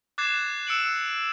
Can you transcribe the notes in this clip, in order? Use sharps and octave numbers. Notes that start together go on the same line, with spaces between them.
D6 F#6 G#6 A6 C7 E7
E6 C#7 D7 E7 F#7